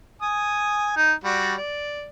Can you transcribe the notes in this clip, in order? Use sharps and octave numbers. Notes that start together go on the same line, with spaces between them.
G#5 D#6
D#4
G3 F#4 D5
D5